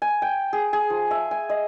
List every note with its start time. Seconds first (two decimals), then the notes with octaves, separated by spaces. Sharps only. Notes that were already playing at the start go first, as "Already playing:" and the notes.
0.02 G#5
0.22 G5
0.53 G#4
0.73 G#4
0.90 F3
1.11 E5
1.31 G#5
1.49 D#5